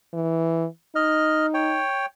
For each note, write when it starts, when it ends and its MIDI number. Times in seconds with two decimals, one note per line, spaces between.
0.13 0.66 52
0.95 1.83 63
0.95 1.46 75
0.95 1.46 89
1.54 2.06 73
1.54 2.06 79